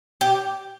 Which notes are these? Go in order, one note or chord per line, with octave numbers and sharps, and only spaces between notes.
G4